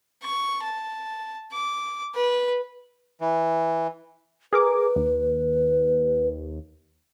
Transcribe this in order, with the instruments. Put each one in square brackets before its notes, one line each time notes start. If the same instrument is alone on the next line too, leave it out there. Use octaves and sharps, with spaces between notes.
[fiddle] C#6
A5
D6
B4
[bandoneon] E3
[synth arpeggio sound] G#4 A#4 D6 [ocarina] B4
[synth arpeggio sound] D#2